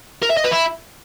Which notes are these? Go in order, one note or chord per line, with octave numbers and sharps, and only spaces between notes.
A#4
E5
D#5
B4
E4